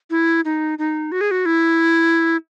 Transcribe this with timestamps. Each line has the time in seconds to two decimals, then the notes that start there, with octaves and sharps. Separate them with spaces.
0.11 E4
0.45 D#4
0.79 D#4
1.12 F#4
1.21 G#4
1.31 F#4
1.46 E4